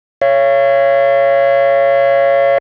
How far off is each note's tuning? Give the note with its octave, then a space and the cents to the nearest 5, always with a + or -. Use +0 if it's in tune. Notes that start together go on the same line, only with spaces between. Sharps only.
C#5 +0 F5 -45